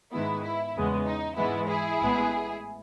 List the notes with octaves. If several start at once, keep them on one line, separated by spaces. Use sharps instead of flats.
G#2 D#3 G#3 B3 E4
E4
E2 C#3 G#3 B3
D#4
G#2 E3 G#3 B3 E4
E4 G#4
A1 A2 G#3 B3